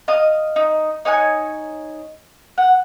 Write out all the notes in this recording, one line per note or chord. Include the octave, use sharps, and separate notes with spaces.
D#5 F5 D#6
D#4
D#4 C#5 G#5 F#6
F#5